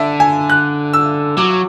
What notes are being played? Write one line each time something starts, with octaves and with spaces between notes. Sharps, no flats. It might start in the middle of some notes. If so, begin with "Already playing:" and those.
Already playing: D3 E5
G#5
F#6
E6
F#3 D6